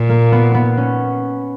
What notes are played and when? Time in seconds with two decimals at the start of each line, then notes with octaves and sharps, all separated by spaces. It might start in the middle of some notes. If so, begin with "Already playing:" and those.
Already playing: A#2
0.09 A#3
0.32 B3
0.55 B3
0.77 C#4